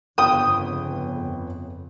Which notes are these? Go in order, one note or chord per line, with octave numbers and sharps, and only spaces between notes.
G1 F2 C#3 B3 G5 D#6